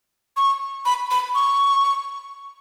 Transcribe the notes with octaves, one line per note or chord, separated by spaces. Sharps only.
C#6
B5
B5
C#6